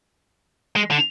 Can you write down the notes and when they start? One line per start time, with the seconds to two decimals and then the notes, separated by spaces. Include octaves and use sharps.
0.76 G#3
0.91 D3